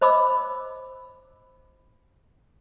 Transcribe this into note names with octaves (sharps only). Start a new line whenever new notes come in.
C5 D#5 B5 D6 E6